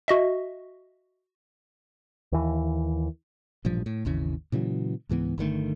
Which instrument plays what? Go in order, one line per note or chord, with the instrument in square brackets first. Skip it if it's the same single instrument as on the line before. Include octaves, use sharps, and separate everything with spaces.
[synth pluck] F#4 D#5 E5
[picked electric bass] D#2 E3
[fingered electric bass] A1 G2 A#2 F3
A2
G#1 D#2 C#3 E3
A#2 C#3 E3 F#3
C#2 G#2 E3 B3
G1 D3 D#3 A3